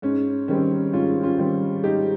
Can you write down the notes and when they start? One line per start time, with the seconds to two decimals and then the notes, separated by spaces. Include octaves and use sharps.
0.02 G#2 C#4
0.48 D#3 G3 C4 C#4
0.93 G#2 C#4 F4
1.23 C#4 F4
1.38 D#3 G3 C4
1.84 G#2 D#4 G4